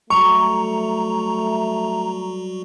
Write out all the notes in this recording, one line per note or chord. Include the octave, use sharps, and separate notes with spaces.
F#3 G3 A3 F#4 A#5 C#6